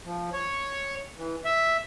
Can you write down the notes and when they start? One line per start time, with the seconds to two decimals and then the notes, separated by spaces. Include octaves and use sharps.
0.05 F3
0.33 C#5
1.18 E3
1.45 E5